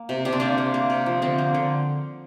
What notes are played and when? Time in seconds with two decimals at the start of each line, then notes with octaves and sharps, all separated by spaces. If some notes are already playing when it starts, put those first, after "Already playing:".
Already playing: A#3
0.09 C3
0.25 C3 D4
0.33 C4
0.40 A#3 D4
0.58 A#3
0.74 A#3
0.90 C3
1.06 F3
1.22 D3 C4
1.38 A#3
1.54 D3